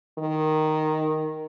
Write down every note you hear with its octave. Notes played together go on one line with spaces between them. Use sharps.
D#3